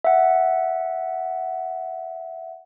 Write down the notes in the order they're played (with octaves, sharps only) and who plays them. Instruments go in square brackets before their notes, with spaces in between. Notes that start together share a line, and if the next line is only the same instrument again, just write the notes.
[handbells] E5 F#5